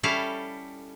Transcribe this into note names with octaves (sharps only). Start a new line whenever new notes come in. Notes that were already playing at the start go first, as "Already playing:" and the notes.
G3 C#4 E4 A4 F5